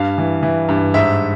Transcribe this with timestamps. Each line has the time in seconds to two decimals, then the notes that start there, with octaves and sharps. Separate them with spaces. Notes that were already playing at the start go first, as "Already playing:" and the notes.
Already playing: G2 F5
0.18 E3
0.43 E3
0.69 G2
0.94 G#2 E5